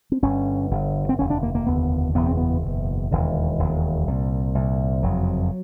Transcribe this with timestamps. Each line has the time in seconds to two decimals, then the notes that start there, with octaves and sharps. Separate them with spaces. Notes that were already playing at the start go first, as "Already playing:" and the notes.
0.12 C4
0.22 G1 G2 D3 C#4
0.70 G1 G2 D3
1.09 C4
1.19 F1 D#2 D3 C#4
1.30 D4
1.43 A#3
1.55 A#3
1.66 F1 D#2 D3 B3
2.15 F#1 E2 B2 B3
2.26 C4
2.37 B3
2.63 F#1 E2 B2
3.11 E1 D#2 D3
3.59 E1 D#2 D3
4.07 C2 A#2
4.55 C2 A#2
5.03 F#1 F2 C3 F#3